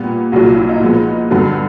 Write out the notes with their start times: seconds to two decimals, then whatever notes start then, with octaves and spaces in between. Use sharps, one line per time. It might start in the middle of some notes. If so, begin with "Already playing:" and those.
Already playing: A#2 G3 B3
0.32 C2 A#2 F#3 F#4
0.45 F4
0.57 E4
0.69 D#4
0.81 A#2 F3 G#3 B3
1.31 G2 D3 F#3 B3